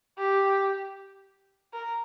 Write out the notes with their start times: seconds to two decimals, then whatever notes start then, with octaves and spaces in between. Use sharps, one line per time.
0.18 G4
1.73 A#4